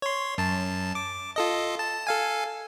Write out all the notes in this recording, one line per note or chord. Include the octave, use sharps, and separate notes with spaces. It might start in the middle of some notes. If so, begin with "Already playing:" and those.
C#5 C6
F#2 A5
D6
F4 A4 D#5
A5
A4 F5 G#5